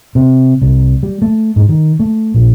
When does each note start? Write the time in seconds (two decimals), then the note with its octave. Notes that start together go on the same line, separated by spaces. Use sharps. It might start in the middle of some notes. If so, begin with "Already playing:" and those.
0.15 C3
0.62 C2
1.03 G3
1.22 A3
1.56 G#2
1.69 D#3
1.99 A3
2.34 A#1